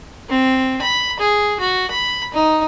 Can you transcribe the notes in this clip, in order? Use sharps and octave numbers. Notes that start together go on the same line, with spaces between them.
C4
B5
G#4
F#4
B5
D#4